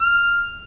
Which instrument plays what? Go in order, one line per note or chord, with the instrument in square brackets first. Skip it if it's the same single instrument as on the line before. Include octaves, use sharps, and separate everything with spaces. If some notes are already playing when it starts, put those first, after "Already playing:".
[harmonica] F6